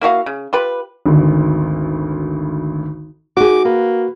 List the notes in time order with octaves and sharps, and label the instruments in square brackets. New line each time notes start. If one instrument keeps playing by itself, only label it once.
[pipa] A#3 E4 F#4 F5
C#3
F4 G4 B4
[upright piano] G#1 D2
[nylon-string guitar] D#4 G#4 [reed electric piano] F#4 [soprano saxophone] D6
[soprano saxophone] A#3 [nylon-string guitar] B4